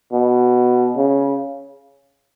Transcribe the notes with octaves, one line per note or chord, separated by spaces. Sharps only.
B2
C#3